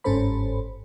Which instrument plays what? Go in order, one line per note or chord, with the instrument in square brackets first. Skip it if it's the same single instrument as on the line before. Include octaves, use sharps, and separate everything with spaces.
[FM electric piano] G1 G#2 C#4 A4 C5 B5